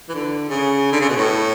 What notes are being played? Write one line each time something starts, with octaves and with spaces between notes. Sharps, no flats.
E3
D3
C#3
D3
C#3
B2
A2